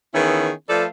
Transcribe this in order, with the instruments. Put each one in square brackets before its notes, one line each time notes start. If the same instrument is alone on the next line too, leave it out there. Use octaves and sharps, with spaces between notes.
[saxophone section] D#3 E3 B3 C#4 E4 G#4
F3 A3 A4 B4 D5 F5